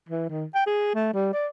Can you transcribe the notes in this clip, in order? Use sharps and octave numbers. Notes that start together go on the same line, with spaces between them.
E3
D#3
G5
G#4
A3
G3
D5